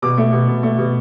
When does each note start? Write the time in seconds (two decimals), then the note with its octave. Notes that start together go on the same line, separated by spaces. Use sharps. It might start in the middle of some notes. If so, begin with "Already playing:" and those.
0.02 B2 D6
0.17 A3
0.32 B2
0.48 B2
0.63 A3
0.78 B2